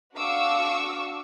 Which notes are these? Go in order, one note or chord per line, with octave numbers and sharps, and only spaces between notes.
D4 F#4 F5 C#6 D6 E6